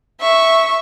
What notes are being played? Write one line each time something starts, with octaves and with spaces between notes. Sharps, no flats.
E5 C#6